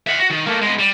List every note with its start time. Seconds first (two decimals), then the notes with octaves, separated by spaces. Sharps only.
0.07 E5 F#5
0.19 F#4
0.31 D#3
0.47 A3 A#3
0.62 G#3 B3
0.79 G3